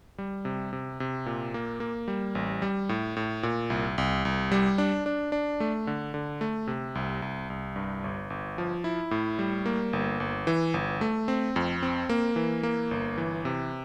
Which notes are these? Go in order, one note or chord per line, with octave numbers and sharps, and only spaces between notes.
G3
C3
C3
C3
A#2
A#3
A#3
G3
A1
G3
A2
A2
A#2
C2
C2
C2
G3
D4
D4
D4
A3
D3
D3
A3
C3
C2
C2
C2
G2
G1
G1
F3
E4
A2
G3
A#3
G1
G1
E3
G1
A3
C4
F2
C4
A#3
E3
A#3
G1
E3
C3